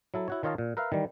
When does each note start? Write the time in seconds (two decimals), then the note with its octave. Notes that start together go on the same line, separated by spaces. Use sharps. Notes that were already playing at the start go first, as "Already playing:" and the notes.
0.14 F#3 E4 A4
0.28 E4 F#4 C#5
0.43 D#3 F4 C#5 D#5 F5 A5
0.58 A#2
0.77 A#4 B4 E5 F5
0.92 D#3 E3 G3